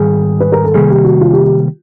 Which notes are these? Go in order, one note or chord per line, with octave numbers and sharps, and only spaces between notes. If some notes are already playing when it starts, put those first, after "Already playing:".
Already playing: G#2 D#3 G3 G#4
B4
A#4
A4
C3 D#3 G3 A#3 G#4
G4
F#4
F4
G4
G4